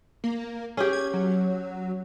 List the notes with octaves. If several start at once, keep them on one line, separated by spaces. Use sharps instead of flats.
A#3
C#4 G4 G#4
G#6
F#3